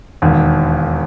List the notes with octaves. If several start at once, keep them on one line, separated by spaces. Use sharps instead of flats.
E1 D#2 D#3